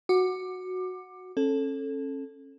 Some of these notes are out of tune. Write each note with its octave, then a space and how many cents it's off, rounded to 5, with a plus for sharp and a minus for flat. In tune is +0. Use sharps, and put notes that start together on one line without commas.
F#4 -5 D6 +20
C#4 -35 A4 +0